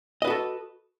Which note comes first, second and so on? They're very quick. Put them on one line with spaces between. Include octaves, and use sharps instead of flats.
D#5 B4 F#4 A4